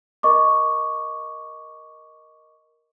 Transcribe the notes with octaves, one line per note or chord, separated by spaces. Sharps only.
A#4 D#5 C#6 D6